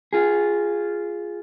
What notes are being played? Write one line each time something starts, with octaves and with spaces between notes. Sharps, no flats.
F4 G#4